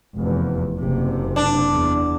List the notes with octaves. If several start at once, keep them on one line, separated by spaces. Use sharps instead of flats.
F1 E2
F#1 C3
D4
E2